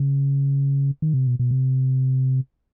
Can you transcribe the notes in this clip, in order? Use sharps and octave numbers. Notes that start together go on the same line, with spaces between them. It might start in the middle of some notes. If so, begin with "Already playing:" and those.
Already playing: C#3
D#3
C3
B2
B2
C3